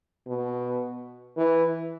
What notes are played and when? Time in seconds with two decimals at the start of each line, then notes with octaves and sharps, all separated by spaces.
0.27 B2
1.37 E3